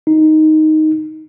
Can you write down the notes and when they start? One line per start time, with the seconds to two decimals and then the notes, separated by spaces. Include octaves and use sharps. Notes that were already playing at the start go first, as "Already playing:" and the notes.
0.07 D#4